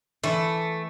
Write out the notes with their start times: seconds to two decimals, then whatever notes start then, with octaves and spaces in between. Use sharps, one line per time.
0.24 E3 A3